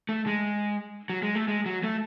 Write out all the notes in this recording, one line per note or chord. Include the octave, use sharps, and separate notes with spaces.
A3
G#3
F#3
G#3
A3
G#3
F#3
A3